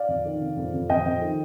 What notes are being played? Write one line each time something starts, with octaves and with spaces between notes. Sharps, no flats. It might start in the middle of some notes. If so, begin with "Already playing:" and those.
Already playing: D5 F5
F2
D#3
C3
F2
F2
F2 D#5 G5
F2
D#3